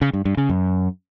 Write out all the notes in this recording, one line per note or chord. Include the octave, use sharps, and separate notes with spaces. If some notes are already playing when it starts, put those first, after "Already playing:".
C#3
G2
G2
C#3
F#2